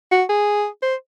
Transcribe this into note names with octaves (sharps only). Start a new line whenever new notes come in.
F#4
G#4
C5